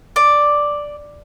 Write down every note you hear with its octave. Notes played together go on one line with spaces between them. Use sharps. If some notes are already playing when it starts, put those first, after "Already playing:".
D5